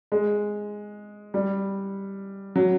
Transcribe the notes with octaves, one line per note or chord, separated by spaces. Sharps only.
G#3
G3
F#3